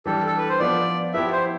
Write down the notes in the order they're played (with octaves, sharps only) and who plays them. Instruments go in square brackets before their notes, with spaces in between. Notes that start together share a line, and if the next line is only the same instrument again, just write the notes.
[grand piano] E3 G3 D4 G4 [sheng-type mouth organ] A4
[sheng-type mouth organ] A4
B4
C5
[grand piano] F3 B3 F4 [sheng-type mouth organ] D5
[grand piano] F3 B3 E4 G4 [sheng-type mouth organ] E5
[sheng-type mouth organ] C5